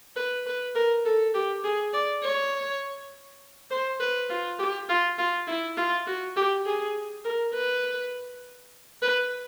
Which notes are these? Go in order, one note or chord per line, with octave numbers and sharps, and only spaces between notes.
B4
B4
A#4
A4
G4
G#4
D5
C#5
C5
B4
F4
G4
F4
F4
E4
F4
F#4
G4
G#4
A#4
B4
B4